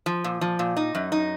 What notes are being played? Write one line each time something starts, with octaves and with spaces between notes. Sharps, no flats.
F3
A#2
F3
A#2
D#4
F#2
D#4